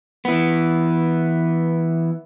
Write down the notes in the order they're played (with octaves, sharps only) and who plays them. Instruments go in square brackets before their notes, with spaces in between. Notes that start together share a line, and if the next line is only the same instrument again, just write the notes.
[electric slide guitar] E3 B3